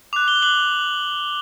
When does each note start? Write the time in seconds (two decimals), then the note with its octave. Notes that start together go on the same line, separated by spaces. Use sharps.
0.13 D6 F#6 F7
0.28 G7
0.42 D6 F#6 F#7